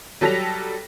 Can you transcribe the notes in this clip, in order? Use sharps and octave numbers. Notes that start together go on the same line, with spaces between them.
F#3 G3 A4 A#6 B6 F7